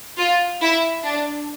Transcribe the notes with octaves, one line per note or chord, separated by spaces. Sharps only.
F4
E4
D4